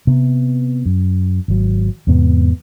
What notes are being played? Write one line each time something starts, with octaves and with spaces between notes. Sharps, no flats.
C3 B3
F#2
G#1 F#3
E2 G#2 C3 B3